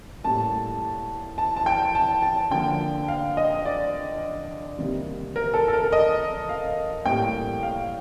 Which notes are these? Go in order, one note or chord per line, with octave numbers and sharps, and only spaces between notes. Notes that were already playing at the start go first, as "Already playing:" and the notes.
A2 G3 A#3 A5
A5
A5
G5
A5
A5
D3 F3 A#3 G5
F5
D#5
D5
C3 D#3 G3 A#3
A#4
A4
A4
A#4
D#5
F5
A2 G3 A#3 G5
F5